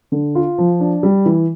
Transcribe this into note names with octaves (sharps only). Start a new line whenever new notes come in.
D3
F4
F3
D4
G3
E3